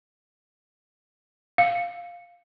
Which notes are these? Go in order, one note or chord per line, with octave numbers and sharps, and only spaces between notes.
F5